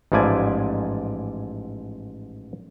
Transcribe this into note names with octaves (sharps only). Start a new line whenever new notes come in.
A1 G#2 F3 E4 D5 G#5